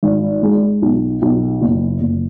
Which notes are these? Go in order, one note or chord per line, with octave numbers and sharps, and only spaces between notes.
G#1
G#3
B1
B1
F#1
F#1